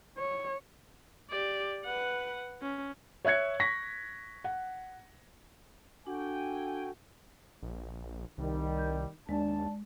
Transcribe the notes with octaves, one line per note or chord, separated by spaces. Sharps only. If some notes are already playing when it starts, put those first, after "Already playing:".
C#5
G4 D5
B4 F#5
C#4
C#5 E5 F#6 G#6 C#7
C#6 A#6 B6
F#5
D4 F#4 A4 G5 G#5
A#1
C2 D#3 G3
G6
D#2 G#3 D4 A5